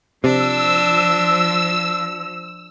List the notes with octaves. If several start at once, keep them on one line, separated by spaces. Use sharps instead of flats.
C3 F3 D4 E6